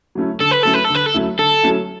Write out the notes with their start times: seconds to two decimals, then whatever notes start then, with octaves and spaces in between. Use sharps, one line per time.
0.15 F#3 A3 C#4 E4
0.40 D3 A4
0.51 B4
0.63 F#3 A3 C#4 E4 A4
0.74 B4
0.84 A4
0.90 D3 B4
1.06 A4
1.14 F#3 A3 C#4 E4
1.39 D3 A4
1.63 F#3 A3 C#4 E4